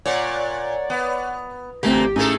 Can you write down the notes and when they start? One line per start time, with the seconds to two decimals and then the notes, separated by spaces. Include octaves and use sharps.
0.06 A#2 C#5 D5 F#5
0.90 B3
1.83 A1 A#2 D3 A3 A#3 C4 G4
2.16 A2 A3 A#3 C#4 D#4 G#4 A4 G#5